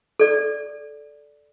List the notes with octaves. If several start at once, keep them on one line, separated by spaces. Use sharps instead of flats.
A4 D5